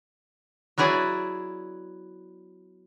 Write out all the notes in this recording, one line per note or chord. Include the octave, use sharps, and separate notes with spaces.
F#3 B3 E4 G#4 D5